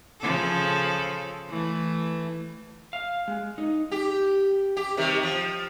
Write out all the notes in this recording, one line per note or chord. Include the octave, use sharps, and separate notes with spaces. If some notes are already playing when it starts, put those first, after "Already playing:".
C#3 F3 A4
E3 A3
F5
G#3
D#4
G4
G4
C3 D#3 G3
F3